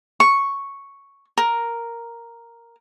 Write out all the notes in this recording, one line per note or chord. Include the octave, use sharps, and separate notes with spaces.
C#6
A#4